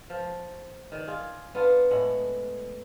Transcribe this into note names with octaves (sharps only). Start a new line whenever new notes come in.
F3
D#3 D5
F4 G#4
B3 D4 F4
A2 G#3 F#5